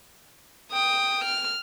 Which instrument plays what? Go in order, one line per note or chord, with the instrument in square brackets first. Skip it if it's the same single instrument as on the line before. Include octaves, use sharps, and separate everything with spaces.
[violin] G5 D#6
F6